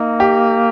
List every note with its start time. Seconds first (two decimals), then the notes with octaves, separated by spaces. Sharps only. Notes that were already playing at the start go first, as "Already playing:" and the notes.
Already playing: A#3 D#4
0.20 G4